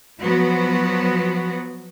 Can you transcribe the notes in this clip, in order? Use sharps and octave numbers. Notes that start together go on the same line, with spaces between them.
F3 F#3 B3 F#4